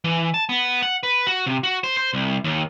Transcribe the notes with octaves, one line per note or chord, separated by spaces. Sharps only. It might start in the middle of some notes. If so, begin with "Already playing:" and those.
E3
A5
B3
F#5
B4
F#4
C3
F#4
C5
C5
C2
D#2